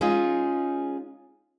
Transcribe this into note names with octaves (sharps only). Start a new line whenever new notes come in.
G#3 C#4 D#4 F4 G#4